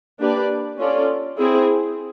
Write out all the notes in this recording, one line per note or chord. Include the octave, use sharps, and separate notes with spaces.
A#3 D4 G4 B4 D5
C#4 F4 A4 D5
C4 E4 G#4